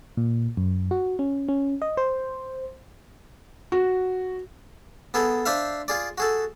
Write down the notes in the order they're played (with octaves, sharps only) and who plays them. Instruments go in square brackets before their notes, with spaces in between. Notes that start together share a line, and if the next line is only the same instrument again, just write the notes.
[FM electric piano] A#2
F#2
F#4
C#4
C#4
D#5
C5
[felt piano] F#4
[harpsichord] B3 G#4 A4
D4 C5 E5 F5
F4 G#4 D5
F#4 G#4 A4